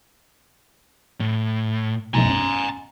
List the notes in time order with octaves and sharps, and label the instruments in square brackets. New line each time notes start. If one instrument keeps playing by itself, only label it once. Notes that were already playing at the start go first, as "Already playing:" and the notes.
[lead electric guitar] A2
[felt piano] E1 B1 F#2 [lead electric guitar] G#5 A#5
[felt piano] C#4